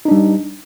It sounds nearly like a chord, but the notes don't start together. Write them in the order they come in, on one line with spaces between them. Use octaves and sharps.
D#4 D4 G3